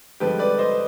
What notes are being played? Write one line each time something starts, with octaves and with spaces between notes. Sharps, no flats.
G2 D3 F3 G#3 G4 B4
B4 D5
C5 D#5